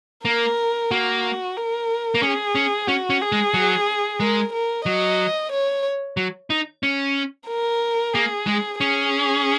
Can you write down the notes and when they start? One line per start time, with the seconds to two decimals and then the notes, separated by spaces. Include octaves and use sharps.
0.25 A#3 A#4
0.91 A#3 F#4
1.57 A#4
2.15 A#3
2.22 C#4 G#4
2.55 C#4
2.88 C#4 F#4
3.10 C#4
3.21 G#4
3.32 G#3
3.54 F#3
4.20 G#3 A#4
4.53 A#4
4.86 F#3 D#5
5.52 C#5
6.17 F#3
6.50 D#4
6.83 C#4
7.48 A#4
8.14 A#3 G#4
8.47 G#3
8.80 C#4 G#4